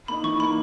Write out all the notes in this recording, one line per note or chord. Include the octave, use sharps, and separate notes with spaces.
A#3 D#4 B5
E3 C#6
A#3 D#4 B5